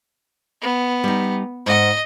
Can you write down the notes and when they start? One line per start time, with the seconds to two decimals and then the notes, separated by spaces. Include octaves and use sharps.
0.62 B3
1.04 G3 D#4
1.66 G#2 D#5 F#5